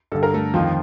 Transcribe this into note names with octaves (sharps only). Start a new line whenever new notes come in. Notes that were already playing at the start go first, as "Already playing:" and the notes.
G2 D3 A4
A#4
A3 A4
F2 D#3 F3 F4